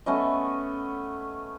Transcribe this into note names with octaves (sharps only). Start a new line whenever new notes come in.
A3 B3 C#4 D#5